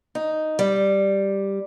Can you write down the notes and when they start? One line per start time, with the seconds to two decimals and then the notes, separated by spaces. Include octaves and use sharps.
0.15 D#4
0.59 G3